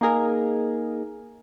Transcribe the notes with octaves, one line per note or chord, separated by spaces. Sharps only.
A#3 D#4 G#4 A#4